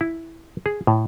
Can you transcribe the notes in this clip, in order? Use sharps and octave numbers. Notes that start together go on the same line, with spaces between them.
E4
G#4
A2